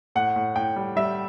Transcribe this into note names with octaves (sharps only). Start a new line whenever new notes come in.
A2 F#5
A2
A2 G5
G3
G3 E5